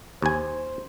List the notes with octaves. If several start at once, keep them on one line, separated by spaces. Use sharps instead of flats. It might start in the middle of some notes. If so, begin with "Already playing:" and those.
D#2 C5 G#5